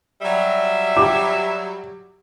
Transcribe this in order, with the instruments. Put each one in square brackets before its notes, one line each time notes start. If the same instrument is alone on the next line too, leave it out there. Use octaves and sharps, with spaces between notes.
[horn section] F#3 G3 [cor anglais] E5
[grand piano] G4 [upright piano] D6